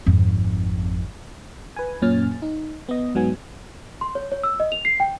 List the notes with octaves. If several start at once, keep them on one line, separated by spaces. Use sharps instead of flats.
G#1 F2
B4 G#5
F#2 A#2 C#4 G#5 F6 A6
D#4
B3 D#5
G#2 F#3 B3 G#5
C6
C#5
C#5
E6
D#5
F7
C7
G5